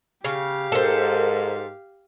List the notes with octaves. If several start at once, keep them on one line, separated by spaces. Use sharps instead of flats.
C#3 G4 F5
G#2 A4 A#4 C5